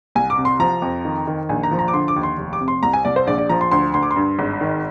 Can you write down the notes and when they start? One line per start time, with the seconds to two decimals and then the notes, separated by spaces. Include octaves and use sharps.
0.15 C2 G#5
0.30 D6
0.38 C3
0.45 C6
0.60 F3 A#5
0.82 F2
1.05 D#3
1.27 D#3
1.49 A#1 G#5
1.63 A#5
1.71 F3
1.79 A#5
1.88 D6
1.94 D3 C6
2.08 D6
2.16 D#2
2.23 C6
2.38 F1
2.53 D6
2.61 C3
2.68 C6
2.83 C2 A#5
2.93 G#5
3.05 C2 D5
3.16 C5
3.27 A#1 D5
3.38 D5
3.49 F3 A#5
3.61 C6
3.71 D2 C6
3.94 D2 C6
4.03 D6
4.11 C6
4.16 G2
4.39 G#1
4.61 D#3